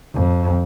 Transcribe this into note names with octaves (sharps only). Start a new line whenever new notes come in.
F2